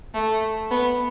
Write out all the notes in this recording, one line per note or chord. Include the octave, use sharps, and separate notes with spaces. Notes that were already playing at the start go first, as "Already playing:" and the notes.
A3
B3